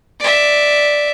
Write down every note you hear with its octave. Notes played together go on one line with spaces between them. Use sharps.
D5 E5